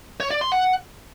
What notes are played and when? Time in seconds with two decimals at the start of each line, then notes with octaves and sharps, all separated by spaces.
0.20 C#5
0.31 D5
0.41 C6
0.52 F#5